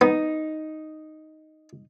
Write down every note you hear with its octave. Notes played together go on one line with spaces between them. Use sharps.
B3 D#4